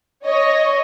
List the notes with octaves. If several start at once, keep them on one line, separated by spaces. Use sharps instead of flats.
C#5 D#5